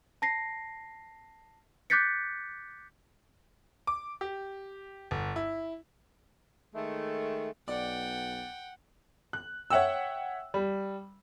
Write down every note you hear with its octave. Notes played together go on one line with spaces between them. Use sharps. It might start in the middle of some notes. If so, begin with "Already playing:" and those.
A5 A#6 C7
D6 F#6 G6 A6 B6 C#7
D6
G4
G1
E4
D#3 G#3 A3
B1 D5 F#5 G5
F#6
C#5 E5 F#5 G5 E6
G3